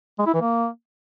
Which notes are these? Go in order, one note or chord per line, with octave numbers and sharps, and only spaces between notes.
G#3
E4
E3
A#3